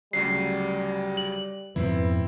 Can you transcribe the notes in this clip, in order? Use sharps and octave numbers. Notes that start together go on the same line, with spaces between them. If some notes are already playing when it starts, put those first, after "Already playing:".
D2 C#3 F#3 G3 C7
F#7
F2 G#2 B2 C4 E4 B4